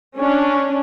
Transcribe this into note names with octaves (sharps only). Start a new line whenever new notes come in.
C#4 D4